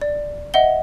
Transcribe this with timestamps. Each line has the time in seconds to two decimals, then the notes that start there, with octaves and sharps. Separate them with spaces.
0.01 D5
0.54 D#5 E5 F#5 G7